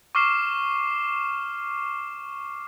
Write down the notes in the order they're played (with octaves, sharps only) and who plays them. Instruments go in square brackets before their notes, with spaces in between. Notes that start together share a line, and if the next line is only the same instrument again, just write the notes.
[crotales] C#6 D6 F6 C7 E7